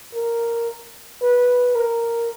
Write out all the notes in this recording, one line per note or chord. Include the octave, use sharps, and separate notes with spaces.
A#4
B4
A#4